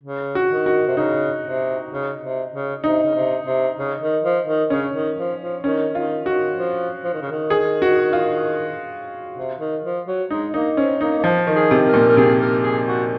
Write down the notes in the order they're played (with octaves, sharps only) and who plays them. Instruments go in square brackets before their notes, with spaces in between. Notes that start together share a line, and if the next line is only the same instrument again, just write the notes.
[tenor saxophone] C#3
[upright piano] F#4
[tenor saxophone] D#3
[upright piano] F#4
[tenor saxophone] C3
[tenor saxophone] C#3 [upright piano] D#4
[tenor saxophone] C3
C#3
C3
C#3
[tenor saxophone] C3 [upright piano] D#4
[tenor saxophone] C#3
C3
C3
C#3
D#3
F3
D#3
[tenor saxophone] C#3 [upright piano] C#4
[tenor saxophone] D#3
F3
F3
[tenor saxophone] D#3 [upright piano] C#4
[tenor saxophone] D#3 [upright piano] F4
[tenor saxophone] D#3 [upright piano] F#4
[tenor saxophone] F3
F3
D#3
C#3
D#3
[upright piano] G#4
F#4
F4
[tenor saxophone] C3
D#3
F3
F#3
[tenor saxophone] G#3 [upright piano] D#4
[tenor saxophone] A#3 [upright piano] D#4
[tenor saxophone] C4 [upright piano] C#4
[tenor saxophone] A#3 [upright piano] D#4
[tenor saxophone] A#3
[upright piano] F3 [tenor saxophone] C4
[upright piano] D#3
[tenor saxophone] G#4
[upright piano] C3
[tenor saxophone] A#4
[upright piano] A#2
[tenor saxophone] A#4
[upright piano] C3 [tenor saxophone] G#4
[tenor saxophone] A#4
G#4
F#4